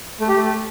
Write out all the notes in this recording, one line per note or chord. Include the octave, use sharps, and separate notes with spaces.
A3
G4
A3